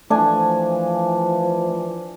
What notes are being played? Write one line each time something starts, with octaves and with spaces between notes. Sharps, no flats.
E3 F3 A3 D4 G#5